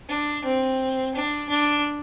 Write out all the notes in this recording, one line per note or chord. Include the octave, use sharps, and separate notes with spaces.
D4
C4
D4
D4